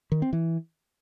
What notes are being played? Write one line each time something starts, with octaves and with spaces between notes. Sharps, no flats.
D#3
C4
E3